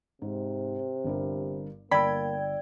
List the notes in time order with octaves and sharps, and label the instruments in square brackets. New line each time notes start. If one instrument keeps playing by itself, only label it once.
[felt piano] G#2 [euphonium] C3
[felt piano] G1 G2 A#4
[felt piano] G1 E6 [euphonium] A#3 [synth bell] D5 G5 G#6 [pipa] B5